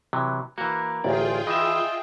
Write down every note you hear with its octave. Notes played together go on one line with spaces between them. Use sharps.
C3 E3 F#3
E3 A#3 F#4
A1 D2 F4 G#4 D5 G5
E3 D#5 E5